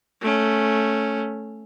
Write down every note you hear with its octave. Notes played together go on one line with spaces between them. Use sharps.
A3 C#4